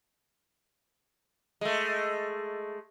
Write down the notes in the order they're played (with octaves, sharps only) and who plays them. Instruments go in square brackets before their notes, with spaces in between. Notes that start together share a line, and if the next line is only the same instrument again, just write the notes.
[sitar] G#3 A3